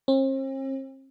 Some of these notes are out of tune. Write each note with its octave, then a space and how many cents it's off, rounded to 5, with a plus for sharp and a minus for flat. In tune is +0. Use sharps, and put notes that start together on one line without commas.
C4 +45